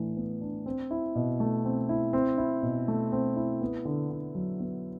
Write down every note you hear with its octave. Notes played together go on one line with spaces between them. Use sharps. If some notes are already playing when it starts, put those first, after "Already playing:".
Already playing: A2 E3 D4
B3
D4
C4
E4
B2
A3
C4
E4
C4
E4
B2
A3
C4
E4
B3
D3
D3
F#3
B3